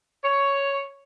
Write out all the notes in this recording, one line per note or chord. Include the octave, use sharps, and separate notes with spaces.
C#5